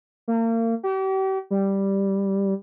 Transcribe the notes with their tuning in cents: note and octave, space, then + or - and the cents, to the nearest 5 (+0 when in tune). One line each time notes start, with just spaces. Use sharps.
A#3 -35
G4 -40
G3 +0